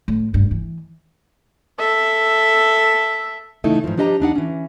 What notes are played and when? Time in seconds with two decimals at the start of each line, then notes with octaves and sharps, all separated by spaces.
0.08 A2
0.33 C2 G2
0.51 E3
1.79 A4 E5
3.64 C#3 E3 A3 D#4 E4 A4
3.84 G#2 B2 E3 F3
3.98 F3 D4 G4 D#5 A5 A#5
4.20 E2 D4 D#4 F#5
4.35 E3 C#4